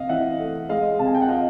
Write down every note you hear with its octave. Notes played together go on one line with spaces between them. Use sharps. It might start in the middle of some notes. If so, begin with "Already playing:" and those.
Already playing: C3 D#5 F5
E3 E5 F#5
A3
G#3 D#5 F5
C3 A5
G#5
G5
F#5
F4 D#5 F5